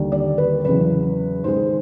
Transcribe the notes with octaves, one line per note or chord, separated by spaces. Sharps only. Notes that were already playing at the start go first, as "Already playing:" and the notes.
Already playing: D#2 D3 G3
D5
B4
E2 C#3 F#3 B4
G#2 D#3 G#3 C5